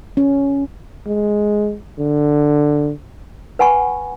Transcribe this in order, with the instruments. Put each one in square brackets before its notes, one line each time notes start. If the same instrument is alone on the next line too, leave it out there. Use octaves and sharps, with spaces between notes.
[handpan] C#4
[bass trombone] G#3
D3
[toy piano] B4 F#5 G#5 B5 C#6